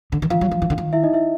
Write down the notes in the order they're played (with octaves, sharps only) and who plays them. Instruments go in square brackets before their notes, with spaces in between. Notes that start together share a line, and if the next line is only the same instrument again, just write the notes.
[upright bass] D3
D#3
[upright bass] E3 [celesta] F4 F5
[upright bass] F#3
F3
E3
D3
D#3
[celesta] E4 E5
D#4 D#5
E4 E5